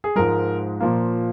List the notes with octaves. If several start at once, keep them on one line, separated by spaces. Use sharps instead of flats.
G#4
G#2 F3 G#3 A#4
A#2 F3 A#3